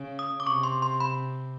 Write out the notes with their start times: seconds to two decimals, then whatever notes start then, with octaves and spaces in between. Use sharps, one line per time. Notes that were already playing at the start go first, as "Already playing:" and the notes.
Already playing: C#3
0.19 D#6
0.40 D6
0.47 C3 C#6
0.63 C6
0.82 C6
1.00 B5